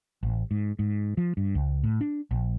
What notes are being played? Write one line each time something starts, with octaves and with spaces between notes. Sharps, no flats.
A1
G#2
G#2
F3
G2
C#2
A2
D4
A#1